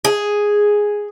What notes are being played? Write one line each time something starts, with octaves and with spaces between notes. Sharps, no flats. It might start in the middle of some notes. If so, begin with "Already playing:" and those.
G#4